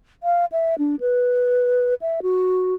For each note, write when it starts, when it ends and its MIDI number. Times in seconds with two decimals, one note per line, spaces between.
0.23 0.45 77
0.52 0.75 76
0.78 0.95 62
1.00 1.94 71
2.01 2.20 76
2.22 2.75 66